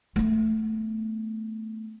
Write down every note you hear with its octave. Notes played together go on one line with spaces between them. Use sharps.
A3 B3